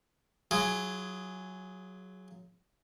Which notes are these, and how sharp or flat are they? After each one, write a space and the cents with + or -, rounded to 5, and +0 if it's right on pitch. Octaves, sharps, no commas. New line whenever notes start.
F#3 +0 F4 -25 G#4 +0